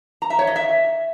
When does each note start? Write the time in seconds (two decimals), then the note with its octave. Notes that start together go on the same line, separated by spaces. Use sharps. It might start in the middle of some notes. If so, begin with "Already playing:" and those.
0.22 A#5
0.30 E5
0.39 C#5
0.47 D#5
0.56 E5